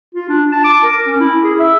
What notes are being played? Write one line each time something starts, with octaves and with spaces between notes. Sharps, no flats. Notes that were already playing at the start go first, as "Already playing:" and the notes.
F4
D4
A5
D6
A#4
C#4
E4
G#4
E5